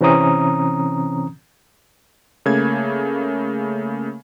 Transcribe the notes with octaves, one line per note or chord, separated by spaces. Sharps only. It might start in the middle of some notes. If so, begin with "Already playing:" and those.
C3 E3 C4 C#4 A#5 D#6
C#3 A3 A#3 G#6